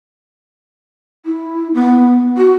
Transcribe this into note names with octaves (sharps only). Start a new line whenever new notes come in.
E4
B3
F#4